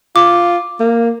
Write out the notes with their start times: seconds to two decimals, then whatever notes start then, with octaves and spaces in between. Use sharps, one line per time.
0.16 F4 D6
0.80 A#3